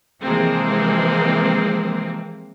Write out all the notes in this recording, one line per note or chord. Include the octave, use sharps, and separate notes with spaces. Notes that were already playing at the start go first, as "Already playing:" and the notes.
C3 E3 F3 G#3 A#3 C4